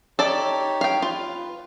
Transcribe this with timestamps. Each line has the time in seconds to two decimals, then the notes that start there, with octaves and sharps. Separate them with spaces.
0.19 D#4 G4 A4 C#5 D5
0.81 F5 G5
1.02 F4 B4